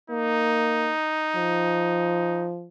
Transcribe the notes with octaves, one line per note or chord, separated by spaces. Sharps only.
A#3 D#4
F3